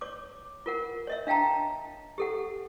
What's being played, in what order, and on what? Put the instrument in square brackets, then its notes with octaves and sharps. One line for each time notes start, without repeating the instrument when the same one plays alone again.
[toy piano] C#5 D6
F4 A#4 F#5
C#5 D#5 E5
D4 F5 G5 A5 A#5
G4 A4 F#5